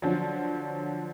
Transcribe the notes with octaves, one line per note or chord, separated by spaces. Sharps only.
D3 F3 F#3